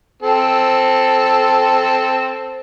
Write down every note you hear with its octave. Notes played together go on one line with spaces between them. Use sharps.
C4 A4